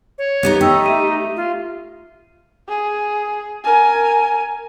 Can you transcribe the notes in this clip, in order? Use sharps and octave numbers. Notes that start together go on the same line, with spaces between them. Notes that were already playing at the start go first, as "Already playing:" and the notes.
C#5
B3 C#4 D#4 G4
A3 D#4 G5 E6
E5 D#7
F4
G#4
A#4 G#5